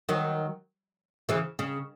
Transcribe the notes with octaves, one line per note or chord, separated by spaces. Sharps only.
D#3 F#3
C#3 E3
C#3